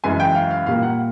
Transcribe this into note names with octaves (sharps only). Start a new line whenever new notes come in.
F#2 C#3 E3 G#3 G#5
G5
F5
F5
A#2 G3 A#3 F5
F#5